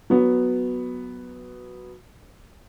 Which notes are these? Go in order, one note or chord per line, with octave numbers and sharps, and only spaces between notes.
F#3 B3